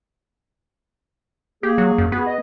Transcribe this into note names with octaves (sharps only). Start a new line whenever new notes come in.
A#3 G4 G#4
F#3
F#2
B3 F#4 G#4
D#5